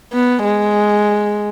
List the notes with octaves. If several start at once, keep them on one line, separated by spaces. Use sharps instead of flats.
B3
G#3